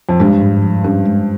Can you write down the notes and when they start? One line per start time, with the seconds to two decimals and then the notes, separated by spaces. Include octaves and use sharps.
0.09 F2
0.20 G2 G#3
0.42 G#2
0.63 F3
0.84 G2 C#4
1.06 G#3